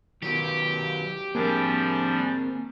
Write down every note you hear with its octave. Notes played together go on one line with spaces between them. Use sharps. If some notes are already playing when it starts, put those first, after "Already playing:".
D#3 F#3 B3 G4
F3 G3 A#3 C4 D4 G#4 G#5